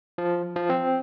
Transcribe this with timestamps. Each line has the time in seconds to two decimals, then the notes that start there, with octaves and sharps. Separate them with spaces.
0.18 F3
0.56 F3
0.69 C4